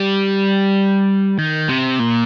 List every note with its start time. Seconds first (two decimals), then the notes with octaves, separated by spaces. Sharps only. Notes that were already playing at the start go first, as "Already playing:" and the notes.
Already playing: G3
1.38 D#3
1.69 C3
2.00 A#2